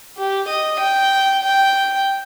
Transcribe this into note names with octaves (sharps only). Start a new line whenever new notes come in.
G4
D#5
G5
G5